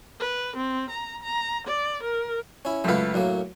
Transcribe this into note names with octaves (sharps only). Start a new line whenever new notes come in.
B4
C4
A#5
A#5
D5
A#4
C#4 E4
C#2 F#2 A3 B4
F#2 A2 F#3 A#3